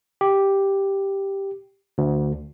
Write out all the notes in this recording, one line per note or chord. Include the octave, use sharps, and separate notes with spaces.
G4
D2